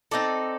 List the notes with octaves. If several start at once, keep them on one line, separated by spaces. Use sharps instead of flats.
C4 D#4 A4 D5